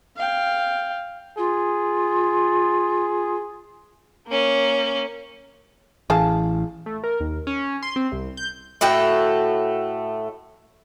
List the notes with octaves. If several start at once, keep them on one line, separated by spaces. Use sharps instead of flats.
F5 G5
F4 G#4
A#3 C#4
A1 E3 G#4 F5 A5
A3
A#4
D#2
C#4
C6
C4
C2
G6
A2 A3 F#4 G5